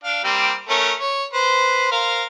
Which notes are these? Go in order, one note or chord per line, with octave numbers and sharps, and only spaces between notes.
D4 F5
G3 A#3 C4
A3 C#4 A#4
C#5
B4 C5
A#4 C5 F5